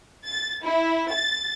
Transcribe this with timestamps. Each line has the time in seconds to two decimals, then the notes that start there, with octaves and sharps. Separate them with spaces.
0.25 A6
0.63 E4
1.10 A6